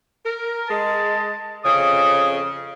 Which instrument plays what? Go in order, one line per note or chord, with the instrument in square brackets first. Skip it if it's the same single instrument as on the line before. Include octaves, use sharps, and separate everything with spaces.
[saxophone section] A#4
[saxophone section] G#3 [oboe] A5
[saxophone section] F2 C#3 [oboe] D#6